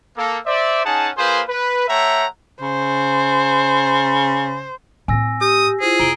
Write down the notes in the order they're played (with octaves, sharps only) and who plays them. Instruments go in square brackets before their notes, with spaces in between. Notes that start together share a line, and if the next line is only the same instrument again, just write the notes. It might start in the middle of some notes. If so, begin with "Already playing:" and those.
[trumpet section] A#3 A4
C5 D5 E5
C#4 D#4 G#4 F#5 A5
A#3 F4 G#4 B4 C5
B4
A3 C#5 E5 F#5 G5 A#5
[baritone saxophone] C#3 [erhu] C5
[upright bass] A2 C4 [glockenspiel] G#5 E6 A#6
[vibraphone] G4 [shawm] D#6
[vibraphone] E4 F4 C5 [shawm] G#4
[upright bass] F1 [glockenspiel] A#5 D7 G7